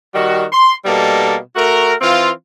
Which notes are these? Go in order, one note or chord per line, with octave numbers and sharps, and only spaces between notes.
D#3 G3 F#4
C6
B2 G3 A#3 D#4 A4
A3 F#4 A#4
E3 C4 F4